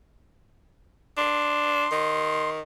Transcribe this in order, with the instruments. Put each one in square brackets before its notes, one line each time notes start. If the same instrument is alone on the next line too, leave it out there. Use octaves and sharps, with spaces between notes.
[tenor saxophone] D4 [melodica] C6
[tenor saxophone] D#3